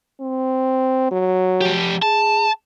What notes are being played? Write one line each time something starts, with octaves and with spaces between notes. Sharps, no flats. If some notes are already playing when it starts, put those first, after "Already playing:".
C4
F#3
F3 G4
G#4 A5